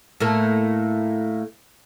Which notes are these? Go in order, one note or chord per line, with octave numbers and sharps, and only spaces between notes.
A2 A3 A#3